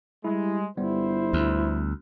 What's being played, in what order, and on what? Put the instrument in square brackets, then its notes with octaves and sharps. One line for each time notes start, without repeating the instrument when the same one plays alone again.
[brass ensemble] G3 G#3 [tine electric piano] E4
[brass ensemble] G1 C5 [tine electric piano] G3 B3 [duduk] E4
[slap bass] D2